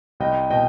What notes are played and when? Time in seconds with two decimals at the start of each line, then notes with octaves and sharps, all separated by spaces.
0.20 C2 D#5 G5
0.50 B2 D#5 G5